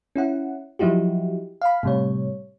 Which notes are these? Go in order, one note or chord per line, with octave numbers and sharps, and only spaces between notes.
C#4 E4 F#5
F3 F#3 D#4 E4 F#4 G4
F5 B5
A2 C3 G3 C#5